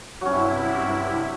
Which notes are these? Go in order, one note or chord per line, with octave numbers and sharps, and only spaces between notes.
G2 C3 F#3 C#4 E4